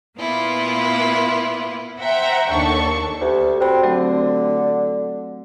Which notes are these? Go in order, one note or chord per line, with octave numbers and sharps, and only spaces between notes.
A#2 A#3 B3 E4 F4
C5 E5 F#5 G5 A#5
D#2 D4 A4 C#6
D2 G4
C4 F#4 B5
D3 F#3 A3 C4